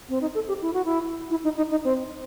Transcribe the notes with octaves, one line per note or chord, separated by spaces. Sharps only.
C4
D#4
A4
G4
E4
F#4
E4
E4
D#4
D#4
D#4
C4